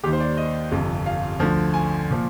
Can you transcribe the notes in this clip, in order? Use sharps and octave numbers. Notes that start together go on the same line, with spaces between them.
D#2 D#3 G4
C5
D5
D#5
G1 F2 C3
F5
D2 D3 F3
G#5
A#2 F3